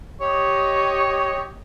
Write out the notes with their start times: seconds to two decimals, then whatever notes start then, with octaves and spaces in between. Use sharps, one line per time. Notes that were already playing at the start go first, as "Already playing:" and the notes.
0.21 G4 C#5 D#5